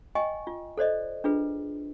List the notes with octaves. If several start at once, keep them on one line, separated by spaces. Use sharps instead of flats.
D#5 G5 G#5 C#6
F4
A4 C5 D5 D#5
D4 F4 G#4 B4